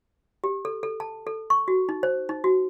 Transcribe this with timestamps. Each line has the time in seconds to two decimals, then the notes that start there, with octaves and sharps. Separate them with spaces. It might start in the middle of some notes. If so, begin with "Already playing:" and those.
0.44 G4
0.65 A4
0.83 A4
1.00 A5
1.27 A4
1.50 C#6
1.68 F#4
1.89 D#4
2.03 C5
2.29 D#4
2.44 F#4